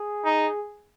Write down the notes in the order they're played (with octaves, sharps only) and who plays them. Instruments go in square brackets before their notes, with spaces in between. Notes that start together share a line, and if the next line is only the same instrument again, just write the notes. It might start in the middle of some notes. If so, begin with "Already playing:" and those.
Already playing: [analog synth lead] G#4
[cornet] D#4